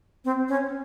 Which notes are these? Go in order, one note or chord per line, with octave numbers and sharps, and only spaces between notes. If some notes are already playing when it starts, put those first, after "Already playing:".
C4
C#4